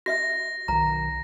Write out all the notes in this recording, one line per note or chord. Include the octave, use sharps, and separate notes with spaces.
F#4 D#5 E5 A#6
B1 D#3 A#5